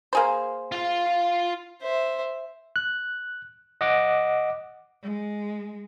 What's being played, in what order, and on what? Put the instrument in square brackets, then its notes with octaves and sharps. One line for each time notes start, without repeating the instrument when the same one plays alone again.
[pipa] A#3 G#4 C5
[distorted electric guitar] F4 F5
[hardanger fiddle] C5 E5
[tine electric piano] F#6
D#5 F#5 D6
[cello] G#3